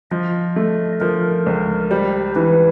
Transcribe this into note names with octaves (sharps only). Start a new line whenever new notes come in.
F3 D#5
A3
F3 A#4
C#2
G3 C5
E3 B4